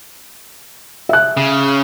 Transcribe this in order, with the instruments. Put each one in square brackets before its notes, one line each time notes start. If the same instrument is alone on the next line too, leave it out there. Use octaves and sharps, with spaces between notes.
[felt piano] E5 F#6
[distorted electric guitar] C#3